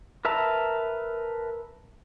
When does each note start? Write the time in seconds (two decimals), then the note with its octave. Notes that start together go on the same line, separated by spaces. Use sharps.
0.25 A#4 B4 E5 A5 A#5